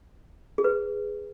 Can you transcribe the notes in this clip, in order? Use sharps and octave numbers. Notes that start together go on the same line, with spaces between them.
G#4
B4